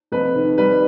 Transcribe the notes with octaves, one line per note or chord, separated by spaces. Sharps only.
F2 B4
D#3
G3 B4